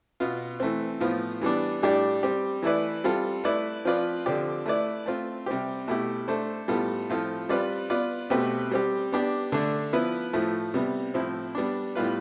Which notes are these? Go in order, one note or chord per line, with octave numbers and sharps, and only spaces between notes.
B2 B3 F4
E3 A3 C4
A2 F3 B3 F4
E3 G3 B3 D4
A2 G3 D4 G4 D5
G3 C4 G4
E3 A3 E4 B4 D5
G3 C4 F4 A4
A3 E4 B4 D5
F3 C4 F4 B4 D5
D3 F3 C4 G4 D5
A3 E4 B4 D5
A3 C4 F4
C3 G3 C4 G4
B2 A3 E4 G4
A3 D4 A4 C5
A2 G3 B3 F4 A4
A2 F3 C4 F4 A4
G3 C4 F4 B4 D5
B3 F4 B4 D5
B2 A3 C4 G4 B4
G3 C4 G4
B3 D4 G4
D3 A3 D4
F3 B3 E4 B4
A2 F3 A3
C3 G3 B3
A2 F3 C4 E4
G3 B3 D4
A2 G3 B3 F4 B4